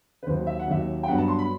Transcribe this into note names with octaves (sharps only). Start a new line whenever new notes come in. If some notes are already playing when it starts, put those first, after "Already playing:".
B4
D#2 D#3 F#3 C5
E5
F#5
D#2 D#3 F#3 E5
G5
G2 F#3 B3 F#5
A5
C6
B5